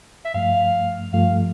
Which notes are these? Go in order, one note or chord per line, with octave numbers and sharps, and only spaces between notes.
E5
G2 F3 A3 F5
G2 F3 A3 F5